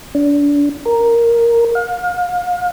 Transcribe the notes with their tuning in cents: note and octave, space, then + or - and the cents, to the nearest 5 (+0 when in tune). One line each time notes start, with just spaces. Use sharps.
D4 -30
A#4 +0
F5 +35